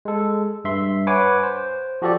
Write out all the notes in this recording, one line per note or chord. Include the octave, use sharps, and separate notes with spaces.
G#3 A4
G2 E5 C6
B4 C#5 F#5 G#5 D6
C5
F3 F#4 G4 A4 D5